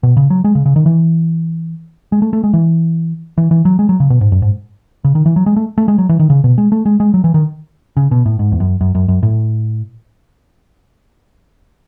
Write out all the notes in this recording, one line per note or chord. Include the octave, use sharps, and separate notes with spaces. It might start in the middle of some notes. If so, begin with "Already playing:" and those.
B2
C#3
F#3
G#3
C#3
C#3
D#3
E3
G#3
A3
A3
G#3
E3
E3
E3
F#3
G#3
F#3
C#3
B2
G#2
F#2
G#2
C#3
D#3
E3
F#3
G#3
A3
A3
G#3
F#3
E3
D#3
C#3
B2
G#3
A3
G#3
G#3
F#3
E3
D#3
C#3
B2
A2
G#2
E2
F#2
F#2
F#2
F#2
A2